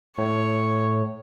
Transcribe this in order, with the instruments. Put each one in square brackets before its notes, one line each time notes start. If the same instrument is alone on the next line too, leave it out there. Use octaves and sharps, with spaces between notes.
[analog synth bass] A2 [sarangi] C#5